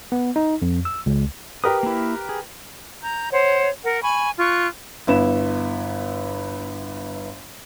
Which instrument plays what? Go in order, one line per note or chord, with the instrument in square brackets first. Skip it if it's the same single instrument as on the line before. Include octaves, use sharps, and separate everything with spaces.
[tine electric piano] B3
D#4
F2
E6
C#2
[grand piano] G4 A#4 B4 [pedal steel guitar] D#6
[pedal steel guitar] A#3 E4
G#4
[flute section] A#5 G6
C5 C#5 F#5
A#4 F#5
G#5 B5 C#6
F4 C#6 F#6
[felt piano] G1 B3 E4 E7